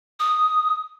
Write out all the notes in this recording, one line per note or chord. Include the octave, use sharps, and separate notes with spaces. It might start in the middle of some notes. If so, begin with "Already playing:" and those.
D#6